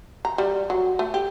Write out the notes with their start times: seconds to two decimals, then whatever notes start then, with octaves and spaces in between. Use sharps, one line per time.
0.25 A#5
0.38 G3
0.70 F#3
0.99 A3
1.14 G4